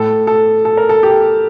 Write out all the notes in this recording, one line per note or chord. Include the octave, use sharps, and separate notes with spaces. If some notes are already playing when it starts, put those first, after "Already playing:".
Already playing: A2 A4
A4
A4
A#4
A4
G4